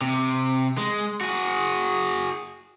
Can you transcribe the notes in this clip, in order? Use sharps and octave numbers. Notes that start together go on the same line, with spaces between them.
C3
G#3
F#4 G#4